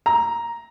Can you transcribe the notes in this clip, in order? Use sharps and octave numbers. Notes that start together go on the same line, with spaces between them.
A#5